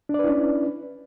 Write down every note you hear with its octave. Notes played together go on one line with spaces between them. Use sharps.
C#4 D4 E4 B4 D5